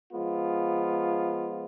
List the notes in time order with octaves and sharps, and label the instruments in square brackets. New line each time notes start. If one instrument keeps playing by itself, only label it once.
[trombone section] F3 G#3 B3 F4